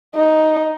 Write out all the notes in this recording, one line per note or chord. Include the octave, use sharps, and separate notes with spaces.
D#4